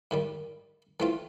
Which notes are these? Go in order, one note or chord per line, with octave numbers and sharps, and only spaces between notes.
G#2 D#3 G3
E3 A3 C4 F4